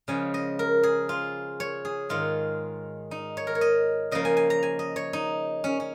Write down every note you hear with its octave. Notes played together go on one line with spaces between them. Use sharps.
C#3 F3 G#3 G#5
D#5
A#4
G#4
F4
C#5
G#4
G#2 D#3 G#3 F4
D#4
C#5
A#4
C#5
D#5
C#3 F3 A#3 D#5
G#5
G#5
A#5
G#5
D#5
C#5
D#4
C#4
C#4